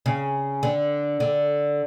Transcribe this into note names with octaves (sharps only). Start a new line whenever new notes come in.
C#3
D3
D3